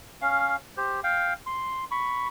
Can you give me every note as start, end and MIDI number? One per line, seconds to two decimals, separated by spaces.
0.22 0.56 61
0.22 0.56 77
0.77 1.00 67
0.77 1.00 72
1.04 1.33 77
1.04 1.33 79
1.46 1.85 84
1.91 2.28 83
1.91 2.28 85